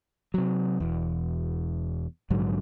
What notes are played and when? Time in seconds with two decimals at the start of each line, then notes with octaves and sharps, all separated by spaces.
0.34 C3 F#3
0.80 E1 E2
2.30 A#1 G#2 D3 F#3